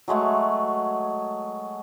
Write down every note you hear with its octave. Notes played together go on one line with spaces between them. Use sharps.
F#3 G#3 A3 F#5